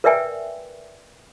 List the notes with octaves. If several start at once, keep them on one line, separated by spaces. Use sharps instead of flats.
A#4 B4 D5 E5 G5 G#5